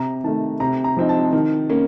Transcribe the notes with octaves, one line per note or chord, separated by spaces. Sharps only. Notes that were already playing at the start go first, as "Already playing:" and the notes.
Already playing: C3 A#5
D#3 A3 A5
C3 A#5
A#5
F3 C4 D#4
A5
D#3
A#3 C#4